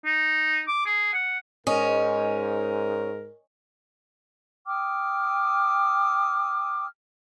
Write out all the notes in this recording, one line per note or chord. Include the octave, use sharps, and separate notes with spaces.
D#4
D6
G#4
F#5
G#2 C#4 A#4 D#5
G5 D6 D#6 F6